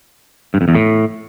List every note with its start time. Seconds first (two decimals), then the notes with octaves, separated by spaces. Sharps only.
0.54 G2
0.61 F2
0.68 E2
0.75 A2